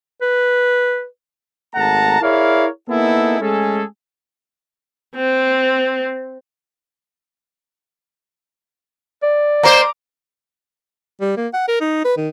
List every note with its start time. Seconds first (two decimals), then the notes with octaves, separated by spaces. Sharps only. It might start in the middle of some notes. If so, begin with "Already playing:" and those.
0.21 B4
1.75 G#1 A3 F#5 A5 A#5
2.21 E4 G#4 A#4 C#5 D5 F5
2.89 A#3 B3 D#4 E4 G#4 A4
3.40 G#3 A3 C#4 G#4 A4
5.15 C4
9.23 D5
9.63 A#3 C5 A#5 D6
11.21 G3
11.37 A#3
11.54 F#5
11.68 A#4
11.81 D#4
12.05 B4
12.17 D#3